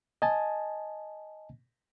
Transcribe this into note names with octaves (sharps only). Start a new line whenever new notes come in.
D#5 G#5 A5